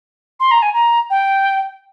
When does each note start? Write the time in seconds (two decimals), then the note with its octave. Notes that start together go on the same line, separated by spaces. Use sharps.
0.40 C6
0.51 A#5
0.62 G#5
0.73 A#5
1.10 G5